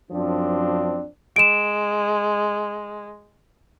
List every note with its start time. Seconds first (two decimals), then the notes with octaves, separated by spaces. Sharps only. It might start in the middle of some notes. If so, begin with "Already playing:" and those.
0.11 F#2 F3 C4 D4
1.36 G#3 D7 E7